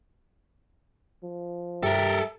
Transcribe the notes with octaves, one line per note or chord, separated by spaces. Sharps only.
F3
G2 G4 A4 A#4 E5 G5